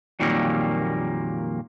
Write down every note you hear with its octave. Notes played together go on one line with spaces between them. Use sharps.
F2 A#2 D#3 F#3 G3 A#3